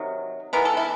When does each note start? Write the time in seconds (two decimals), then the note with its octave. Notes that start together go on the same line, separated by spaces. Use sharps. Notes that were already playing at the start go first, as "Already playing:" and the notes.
Already playing: C3 D#3 F#3
0.53 E3 G#3 B3 A#4
0.65 A4
0.77 E4